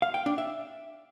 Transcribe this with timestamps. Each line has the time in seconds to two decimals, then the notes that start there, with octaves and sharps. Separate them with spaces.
0.02 F5
0.14 G5
0.26 D4
0.38 E5